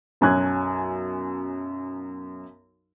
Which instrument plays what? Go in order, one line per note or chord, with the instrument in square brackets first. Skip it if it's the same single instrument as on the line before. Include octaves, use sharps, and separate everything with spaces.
[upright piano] B1 F#2 F#3 G#5 F#6 G#6